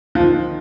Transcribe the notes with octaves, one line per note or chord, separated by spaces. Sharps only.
F3
D#3